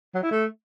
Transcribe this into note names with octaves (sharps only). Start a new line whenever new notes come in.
F#3
E4
A3